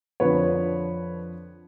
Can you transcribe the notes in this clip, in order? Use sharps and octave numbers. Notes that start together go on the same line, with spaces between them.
F2 D3 F3 B4 C#5